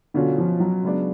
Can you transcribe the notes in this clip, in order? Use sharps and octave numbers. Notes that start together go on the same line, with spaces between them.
B2 D3 F#3 C#4 F4
F3
F#3
C#3 G#3 B3 D4